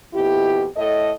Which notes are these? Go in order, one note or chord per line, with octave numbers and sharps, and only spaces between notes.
F2 B2 E4 G4
A2 A4 D#5